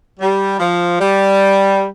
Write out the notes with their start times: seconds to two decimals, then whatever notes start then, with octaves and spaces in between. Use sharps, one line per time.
0.20 G3
0.59 F3
1.00 G3